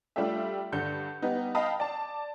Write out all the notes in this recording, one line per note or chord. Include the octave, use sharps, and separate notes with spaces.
G3 A3 D4 F4 G4 E5
G2 D3 G6 C#7
G3 B3 D#4
D#5 F5 G5 A5 B5 D#6
D5 A5